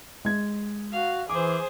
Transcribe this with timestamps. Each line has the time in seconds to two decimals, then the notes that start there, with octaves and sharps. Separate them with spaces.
0.25 G#3 G#6
0.92 F#4 F5
1.29 E3 G#4 C5 D6